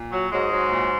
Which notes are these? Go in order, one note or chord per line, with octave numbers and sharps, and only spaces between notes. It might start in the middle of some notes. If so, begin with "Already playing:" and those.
Already playing: A#2
F#3
G#2 F#3 G#3
F#3
A#2